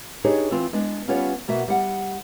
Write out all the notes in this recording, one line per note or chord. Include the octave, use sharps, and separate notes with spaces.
D4 D#4 G4 G#4 B4 C#5
E3 C4 F4
G#3 B3 D4
G3 B3 C#4 F4 B4 C#5
B2 A#3 F#4 E5
G3 F#5